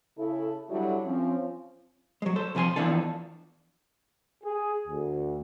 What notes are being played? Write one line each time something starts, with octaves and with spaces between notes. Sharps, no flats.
C#3 E4 A4
D3 F#3 G3 E4 F#4 A4
F3 C4 C#4
F#3 G#3
A4 C5
C3 F3 C5 G#5 C6
E2 G#2 E3 F3 D4 A4
G#4
D2